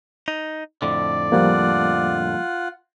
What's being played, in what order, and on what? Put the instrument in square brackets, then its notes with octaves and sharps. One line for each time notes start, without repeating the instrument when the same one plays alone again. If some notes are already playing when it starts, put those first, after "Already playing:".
[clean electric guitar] D#4
[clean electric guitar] F2 A2 D3 [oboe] D5
[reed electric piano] F3 G3 A#3 [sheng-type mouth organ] F4 F#5